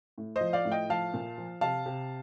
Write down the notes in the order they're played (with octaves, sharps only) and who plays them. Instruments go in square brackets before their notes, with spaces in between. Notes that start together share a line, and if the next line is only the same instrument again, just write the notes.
[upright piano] A2
C5 D#5
F3
D5 F5
A2
D#5 G5
F3 F5 A5
A#2
F3
C3 F5 A5
C3